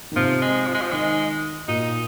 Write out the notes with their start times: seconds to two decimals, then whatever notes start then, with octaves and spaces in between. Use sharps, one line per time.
0.12 D#3
0.16 C3 F3
0.42 G#3
0.67 F3
0.74 G#3
0.82 F3
0.92 D#3 G#3
1.68 A#2 D#4